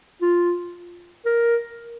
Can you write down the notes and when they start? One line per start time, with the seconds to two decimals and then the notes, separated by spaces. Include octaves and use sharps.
0.22 F4
1.25 A#4